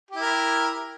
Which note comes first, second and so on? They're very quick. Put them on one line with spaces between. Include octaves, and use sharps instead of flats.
G4 E4 A#4